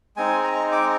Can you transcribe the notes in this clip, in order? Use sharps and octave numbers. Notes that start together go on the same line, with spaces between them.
G#3 C4 D#4 G#5
A#5
D6